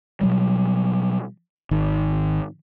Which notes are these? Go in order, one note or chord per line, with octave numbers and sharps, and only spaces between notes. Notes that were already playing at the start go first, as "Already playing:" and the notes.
B2 F#3 G3
G#1 D#3